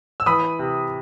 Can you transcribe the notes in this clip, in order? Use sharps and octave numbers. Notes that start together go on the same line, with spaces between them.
E6
E3 B5 D#6
C3